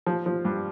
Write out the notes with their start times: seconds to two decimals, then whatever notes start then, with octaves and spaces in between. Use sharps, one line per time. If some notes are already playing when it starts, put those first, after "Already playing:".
0.06 F3
0.26 F3
0.45 G2